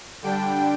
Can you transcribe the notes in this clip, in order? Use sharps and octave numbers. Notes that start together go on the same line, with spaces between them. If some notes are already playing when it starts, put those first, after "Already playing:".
D3 G3 D4 G5